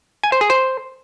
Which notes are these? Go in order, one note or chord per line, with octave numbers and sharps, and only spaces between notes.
G#5
C5
G#4
C5